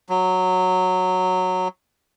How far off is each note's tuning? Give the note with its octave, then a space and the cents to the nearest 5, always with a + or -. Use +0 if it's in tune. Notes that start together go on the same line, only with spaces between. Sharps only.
F#3 -5